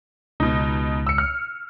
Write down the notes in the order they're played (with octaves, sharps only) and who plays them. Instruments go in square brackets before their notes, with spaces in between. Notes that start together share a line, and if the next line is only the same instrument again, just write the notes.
[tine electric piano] C#2 [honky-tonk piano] B2 D#4
[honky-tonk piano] E6 C#7
F6